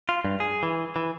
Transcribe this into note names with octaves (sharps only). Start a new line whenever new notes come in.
F4
G2
G#4
E3
E3